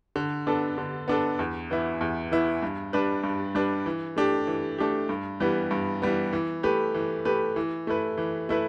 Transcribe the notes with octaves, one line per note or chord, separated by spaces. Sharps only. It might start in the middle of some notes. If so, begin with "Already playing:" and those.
D3
B3 D4 A4
D3
B3 D4 A4
E2
E3 B3 E4
E2
E3 B3 E4
G2
G3 D4 B4
G2
G3 D4 B4
E3
A3 D4 G4
E3
A3 D4 G4
G2
E3 G3 B3
G2
E3 G3 B3
E3
A3 G4 B4
E3
A3 G4 B4
E3
A3 E4 B4
E3
A3 E4 B4